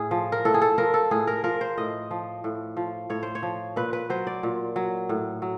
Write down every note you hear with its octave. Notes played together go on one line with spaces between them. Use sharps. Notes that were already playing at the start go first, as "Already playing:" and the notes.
Already playing: A2 G#4
F3
A#4
A2 A4
G#4
A4
F3 A#4
A4
A2 G#4
A#4
F3 A#4
C5
A2 D#5
F3
A2
F3
A2 C#5
C5
C#5
F3
A#2 B4
B4
F#3 C5
D5
A#2
F#3
A2
F#3